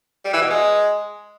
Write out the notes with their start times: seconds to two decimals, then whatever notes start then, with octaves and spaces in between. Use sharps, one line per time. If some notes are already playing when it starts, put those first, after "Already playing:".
0.25 G3
0.33 E3
0.42 B2
0.50 G#3